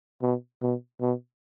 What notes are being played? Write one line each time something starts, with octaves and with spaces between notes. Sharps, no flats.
B2
B2
B2